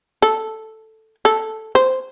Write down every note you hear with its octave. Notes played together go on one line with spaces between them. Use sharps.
A4
A4
C5